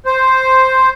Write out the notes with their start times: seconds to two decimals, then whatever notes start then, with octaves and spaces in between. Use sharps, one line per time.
0.06 C5